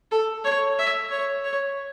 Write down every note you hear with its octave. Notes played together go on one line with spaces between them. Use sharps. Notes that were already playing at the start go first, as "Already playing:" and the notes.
A4
C#5
E5
C#5
C#5